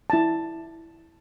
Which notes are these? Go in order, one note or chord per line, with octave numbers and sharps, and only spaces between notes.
E4 A5